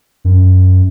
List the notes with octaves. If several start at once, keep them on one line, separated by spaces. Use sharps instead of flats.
F#2